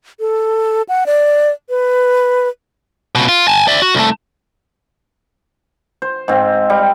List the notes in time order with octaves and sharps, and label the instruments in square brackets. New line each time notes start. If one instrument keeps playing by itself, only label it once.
[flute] A4
F#5
D5
B4
[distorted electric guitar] C#2 B2
F4
G#5 A5
D5 E5
F#4
C2 A3
[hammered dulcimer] C5
G#2 C4
G3